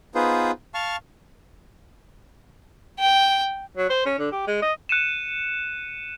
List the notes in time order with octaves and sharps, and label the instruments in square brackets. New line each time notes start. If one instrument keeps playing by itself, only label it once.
[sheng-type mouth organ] B3 D#4 F4 G#4 B4 C5
F5 A5 C#6 F6
[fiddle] G5
[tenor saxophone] F#3
C5
C#4
D3
G4
G#3
D#5
[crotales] F#6 C#7 D#7 E7